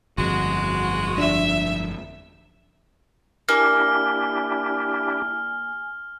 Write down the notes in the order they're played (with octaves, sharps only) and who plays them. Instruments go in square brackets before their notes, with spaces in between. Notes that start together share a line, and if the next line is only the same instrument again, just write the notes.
[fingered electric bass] G1 F2 [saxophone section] G#3 F#4
[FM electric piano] F3 D4 [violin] E5
[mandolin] A#3 [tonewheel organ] D4 E4 G4 [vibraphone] G#5 [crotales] F6